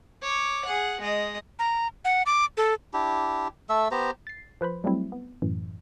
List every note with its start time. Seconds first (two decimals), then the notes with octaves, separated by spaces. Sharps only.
0.22 C#5 D6
0.64 G#4 F#5
1.00 G#3 D#5
1.59 A#5
2.05 F#5
2.26 D6
2.57 A4
2.94 D4 E4 G4
3.69 A3 A4 E5 E6
3.91 B3 G4 C5 A#5
4.27 A6 C7
4.61 F3 B4 C5 B5
4.84 F#3 G3 A3 C4 E4
5.12 B3
5.42 F#2 A2 E3